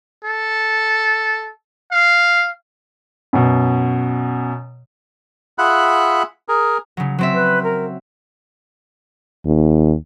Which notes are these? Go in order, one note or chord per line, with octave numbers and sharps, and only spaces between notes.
A4
F5
F#2 B2
F4 G#4 E5 F#5 B5 F#6
G#4 A#4
C#3 F#3
F#3 C4 E5
B4
A#4
D#2